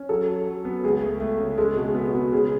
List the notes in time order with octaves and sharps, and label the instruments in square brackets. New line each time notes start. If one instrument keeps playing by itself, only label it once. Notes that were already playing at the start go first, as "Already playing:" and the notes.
Already playing: [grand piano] C#4
[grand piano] F#3 [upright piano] A4
[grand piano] F#3
F#3
B3
[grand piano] C#2 [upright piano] G#4
[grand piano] A3
A3
C#3
[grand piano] G#3 [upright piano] A4
[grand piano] B2
[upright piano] G#4
[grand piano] B3
[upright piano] F#4
[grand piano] B3
[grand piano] C#3 [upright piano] G#4